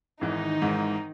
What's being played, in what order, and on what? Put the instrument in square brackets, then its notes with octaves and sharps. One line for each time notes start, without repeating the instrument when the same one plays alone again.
[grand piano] G#1 G#2 E3 [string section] D#3 D#4
[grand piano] G#1 G#2 E3